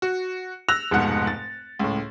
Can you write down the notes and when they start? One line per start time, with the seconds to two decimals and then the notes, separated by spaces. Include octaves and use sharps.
0.02 F#4
0.69 E6 F#6 A#6 F7
0.91 F1 G#2 B2 F#5 F#6
1.27 A6
1.79 C#2 A2